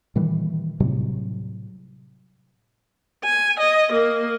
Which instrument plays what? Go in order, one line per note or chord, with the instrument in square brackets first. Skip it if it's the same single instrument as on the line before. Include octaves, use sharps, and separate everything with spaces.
[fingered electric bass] A#2 D#3 E3 G3
A2 C3 F#3 G3
[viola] G#5
D#5
A#3